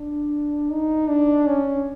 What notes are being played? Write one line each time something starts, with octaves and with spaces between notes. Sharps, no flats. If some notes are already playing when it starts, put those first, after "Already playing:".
Already playing: D4
D#4
D4
C#4